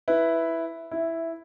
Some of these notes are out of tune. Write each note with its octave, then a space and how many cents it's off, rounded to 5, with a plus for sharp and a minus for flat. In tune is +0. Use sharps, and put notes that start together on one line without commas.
E4 +0 B4 +0
E4 +0 E5 +10